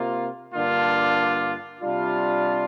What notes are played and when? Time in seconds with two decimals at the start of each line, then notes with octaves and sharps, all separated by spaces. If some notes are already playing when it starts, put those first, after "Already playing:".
Already playing: C3 A#3 F4
0.54 G2 D3 A#3 D4 F4
1.81 C3 G3 D4 F4